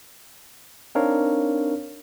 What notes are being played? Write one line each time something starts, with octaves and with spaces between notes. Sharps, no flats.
C4 D4 D#4 A#4 C#5 F5